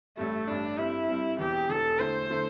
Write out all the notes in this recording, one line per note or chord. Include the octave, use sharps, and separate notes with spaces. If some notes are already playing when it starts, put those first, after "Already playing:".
A1 G2 G3 A3
A1 G2 G3 D4
G2 G3 C4 E4
G2 G3 C4
E1 E2 E3 G4
E1 E2 E3 A4
D3 A3 E4 A4 C5
D3 A3 E4 A4